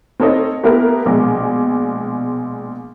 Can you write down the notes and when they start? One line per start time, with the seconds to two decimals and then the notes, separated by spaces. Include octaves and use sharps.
0.20 C4 D#4 A4 C#5 D#5
0.64 A#3 B3 E4 G4 A4 A#4
1.06 A#1 B2 G#3